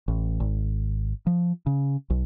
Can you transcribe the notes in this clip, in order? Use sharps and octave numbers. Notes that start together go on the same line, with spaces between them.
A1
G#1
F3
C#3
B1